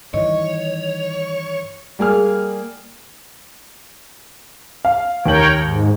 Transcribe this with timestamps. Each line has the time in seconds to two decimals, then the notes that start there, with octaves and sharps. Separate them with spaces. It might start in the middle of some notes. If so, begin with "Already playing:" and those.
0.14 G2 D#3 E3 C#5 D#5
1.99 G3 A#3 G#4 F6
4.85 F5
5.26 D#2 A#4 C#5 G5 F#7
5.60 G#2